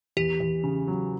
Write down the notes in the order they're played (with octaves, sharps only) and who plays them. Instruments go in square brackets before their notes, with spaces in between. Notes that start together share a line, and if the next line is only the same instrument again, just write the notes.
[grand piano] E2 [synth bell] G4
[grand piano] E2
C#3
F#3